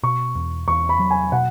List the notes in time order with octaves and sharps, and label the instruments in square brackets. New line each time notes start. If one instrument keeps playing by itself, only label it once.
[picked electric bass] B2 [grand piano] C#6
[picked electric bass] E2
[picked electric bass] E2 [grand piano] C#6
[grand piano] B5
[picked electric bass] F#3
[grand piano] G#5
[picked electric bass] B2 [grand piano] F#5